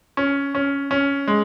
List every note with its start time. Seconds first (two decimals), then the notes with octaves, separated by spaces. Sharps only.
0.17 C#4
0.55 C#4
0.91 C#4
1.28 G#3